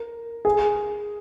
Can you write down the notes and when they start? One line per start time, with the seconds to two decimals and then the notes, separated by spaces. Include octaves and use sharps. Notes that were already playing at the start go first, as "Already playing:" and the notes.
Already playing: A#4
0.45 G#4